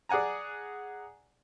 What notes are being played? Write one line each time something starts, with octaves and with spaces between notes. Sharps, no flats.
G#4 D5 F#5 G#5 A#5